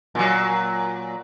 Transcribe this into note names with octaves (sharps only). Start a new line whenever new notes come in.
A#2 F#3